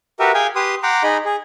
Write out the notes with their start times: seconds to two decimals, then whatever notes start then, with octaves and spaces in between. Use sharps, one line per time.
0.19 F#4 G4 A#4 B4 E5
0.34 G#4 F5 G5 G#5
0.55 G4 B4 C6 D#6
0.83 F#5 G5 A#5 C6 D6
1.03 D#4 G#4 D#5 B5
1.25 G#4